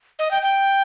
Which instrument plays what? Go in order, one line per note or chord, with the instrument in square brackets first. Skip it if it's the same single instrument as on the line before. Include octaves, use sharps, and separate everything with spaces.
[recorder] D#5
G5
G5